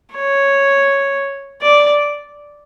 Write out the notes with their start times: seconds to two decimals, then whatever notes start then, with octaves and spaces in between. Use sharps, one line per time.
0.14 C#5
1.62 D5